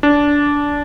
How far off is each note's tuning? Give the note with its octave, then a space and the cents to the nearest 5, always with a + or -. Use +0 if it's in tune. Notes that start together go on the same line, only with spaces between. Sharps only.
D4 -15